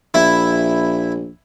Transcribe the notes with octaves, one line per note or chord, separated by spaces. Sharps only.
A#1 E4